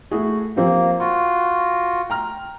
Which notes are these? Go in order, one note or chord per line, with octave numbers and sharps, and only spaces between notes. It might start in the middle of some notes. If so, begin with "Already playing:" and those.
A3 E4 F#4 G#4
F3 A#3 C4 G4
F4 F#4 C#6
G5 A#5 F6